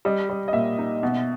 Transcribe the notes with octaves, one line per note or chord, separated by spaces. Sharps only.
G3 D#5
G3
D#5
A#2 E5
D#4
B2